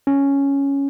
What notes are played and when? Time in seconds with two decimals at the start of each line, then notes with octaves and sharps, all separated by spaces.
0.07 C#4